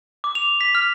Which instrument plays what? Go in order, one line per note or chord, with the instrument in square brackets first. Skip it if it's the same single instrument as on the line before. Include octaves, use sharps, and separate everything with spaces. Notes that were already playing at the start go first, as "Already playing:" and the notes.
[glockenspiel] D6
F7
B6
F6